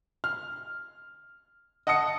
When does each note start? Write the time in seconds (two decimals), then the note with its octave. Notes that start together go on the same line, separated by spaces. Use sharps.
0.24 F6
1.87 D#5 F#5 A5 D#6 C#7